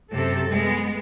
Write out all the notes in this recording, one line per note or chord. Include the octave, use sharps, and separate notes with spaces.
F#2 C3 A4
G#3 B3